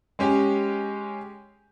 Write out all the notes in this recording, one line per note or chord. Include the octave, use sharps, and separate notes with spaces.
G#3 C#4 G4